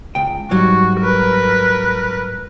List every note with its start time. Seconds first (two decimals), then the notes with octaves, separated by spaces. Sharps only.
0.15 C#2 G5
0.51 G#2 F#3 G3 F#4
1.01 A#4 B4